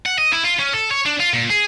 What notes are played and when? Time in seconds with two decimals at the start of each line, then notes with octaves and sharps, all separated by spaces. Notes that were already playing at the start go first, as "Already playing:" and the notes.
0.06 F#5
0.18 D#5
0.33 E4
0.45 F4
0.60 C#4
0.74 A4
0.91 C#5
1.06 D4
1.20 F4
1.34 A#2
1.50 G#4